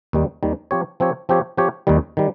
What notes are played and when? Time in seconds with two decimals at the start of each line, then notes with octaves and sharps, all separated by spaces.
0.13 D#2 D#3 G3
0.43 D#2 D#3 G3
0.71 F3 C4 G4 C#5
1.00 F3 C4 G4 C#5
1.29 F3 C4 G4 C#5
1.57 F3 C4 G4 C#5
1.87 D#2 D#3 G3
2.17 D#3 G3